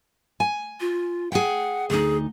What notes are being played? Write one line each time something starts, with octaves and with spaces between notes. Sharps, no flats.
G#5
F4
G#4 F#5 G5
D2 D#4 G#4